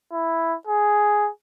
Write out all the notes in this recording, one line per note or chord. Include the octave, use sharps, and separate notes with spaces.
E4
G#4